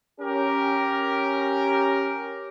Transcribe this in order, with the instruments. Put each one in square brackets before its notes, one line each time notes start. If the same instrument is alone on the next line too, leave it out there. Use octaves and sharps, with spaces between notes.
[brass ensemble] C#4 G4 A#4